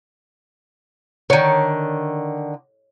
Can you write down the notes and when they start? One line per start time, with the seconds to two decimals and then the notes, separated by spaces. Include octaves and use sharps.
1.30 D3 D#3 C#5